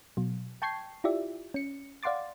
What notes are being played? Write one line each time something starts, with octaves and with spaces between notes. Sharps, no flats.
B2 F#3
G5 A5 C#6 G6 G#6 C7
E4 F4 G4 D5 E5
C#4 C#7
D5 F5 F#5 C6 D6 A6